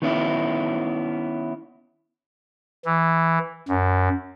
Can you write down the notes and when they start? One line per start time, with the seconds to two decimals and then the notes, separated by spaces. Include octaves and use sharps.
0.02 D#3 B3 C#4 E4
2.85 E3
3.68 F#2